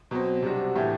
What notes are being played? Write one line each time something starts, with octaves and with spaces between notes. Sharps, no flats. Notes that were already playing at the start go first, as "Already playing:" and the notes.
B2 F#3 C4
C3 G3 D4 F#4
A2 E3 A3 E4 G4